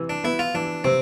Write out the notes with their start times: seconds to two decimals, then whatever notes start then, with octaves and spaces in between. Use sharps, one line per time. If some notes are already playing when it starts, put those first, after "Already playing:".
Already playing: C3 E3
0.10 D4
0.24 B3 E4
0.39 F4
0.54 E3 D4
0.84 C3 C4